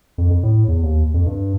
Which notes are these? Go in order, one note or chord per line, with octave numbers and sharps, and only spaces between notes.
F2
F2
A2
E2
D#2
F2
G2